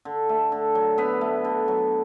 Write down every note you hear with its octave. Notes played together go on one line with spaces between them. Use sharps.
D3
A3
D3
F#3
D3 B3 B4
A3
D3
F#3